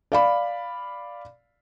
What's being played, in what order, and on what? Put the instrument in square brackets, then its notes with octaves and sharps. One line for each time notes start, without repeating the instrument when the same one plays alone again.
[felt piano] D5 F5 B5